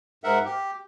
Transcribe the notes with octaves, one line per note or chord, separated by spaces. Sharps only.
G#2 A#4 E5 F#5
G4